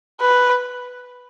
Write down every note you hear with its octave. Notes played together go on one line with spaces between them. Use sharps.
B4